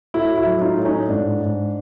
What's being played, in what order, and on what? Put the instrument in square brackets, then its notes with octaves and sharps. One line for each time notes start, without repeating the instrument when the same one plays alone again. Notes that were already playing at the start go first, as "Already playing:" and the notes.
[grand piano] A2 E4 F#4
E4 F#4
F#3
D#4 F4
A2
C#4 D#4
G#2 D4
G#2